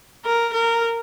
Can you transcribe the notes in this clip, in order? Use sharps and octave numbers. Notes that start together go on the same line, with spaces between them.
A#4
A#4